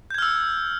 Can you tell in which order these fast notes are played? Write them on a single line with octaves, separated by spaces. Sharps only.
G6 G#6 F6 E6